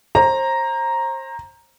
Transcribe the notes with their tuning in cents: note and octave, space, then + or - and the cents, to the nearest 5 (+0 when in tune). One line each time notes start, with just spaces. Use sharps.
C5 +30 A#5 +0